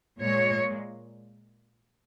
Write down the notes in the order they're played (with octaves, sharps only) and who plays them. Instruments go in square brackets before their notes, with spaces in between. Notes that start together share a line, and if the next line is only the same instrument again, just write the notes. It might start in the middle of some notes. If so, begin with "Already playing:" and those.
[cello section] A#2 G#3 C#5